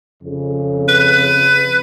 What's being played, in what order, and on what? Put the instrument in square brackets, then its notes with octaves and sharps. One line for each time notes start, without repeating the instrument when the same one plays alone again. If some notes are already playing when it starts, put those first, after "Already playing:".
[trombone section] F2 C#3
[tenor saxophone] B4